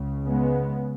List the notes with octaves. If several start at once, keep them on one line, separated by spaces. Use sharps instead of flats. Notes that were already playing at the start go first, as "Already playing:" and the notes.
Already playing: C#2 C#3
G#3 B3